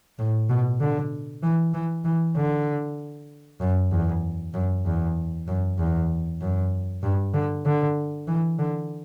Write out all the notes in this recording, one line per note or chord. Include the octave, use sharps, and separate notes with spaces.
A2
B2
D3
E3
E3
E3
D3
F#2
E2
F#2
E2
F#2
E2
F#2
G2
D3
D3
E3
D3